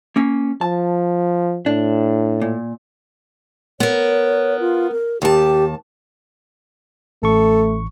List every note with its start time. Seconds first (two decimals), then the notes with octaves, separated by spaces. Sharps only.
0.16 A#3 C#4
0.61 F3 A5
1.66 A2 D4
2.41 A#2
3.80 B3 A#4 C#5
4.60 F4
4.92 A#4
5.22 D#2 G4 A5
7.23 A1 A3 A4 C#6